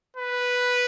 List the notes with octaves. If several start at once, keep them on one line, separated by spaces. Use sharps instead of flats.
B4